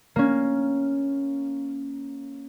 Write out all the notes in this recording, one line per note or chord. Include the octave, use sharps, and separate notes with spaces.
A#3 C#4